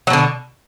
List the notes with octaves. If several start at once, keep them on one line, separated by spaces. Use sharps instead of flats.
B2 D3 F#3